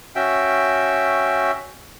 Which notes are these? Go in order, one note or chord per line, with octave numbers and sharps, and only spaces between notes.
C#4 F#4 E5 G5